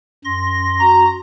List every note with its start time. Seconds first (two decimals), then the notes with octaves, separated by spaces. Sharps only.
0.25 F#2 C6 A#6
0.80 F#4 A#5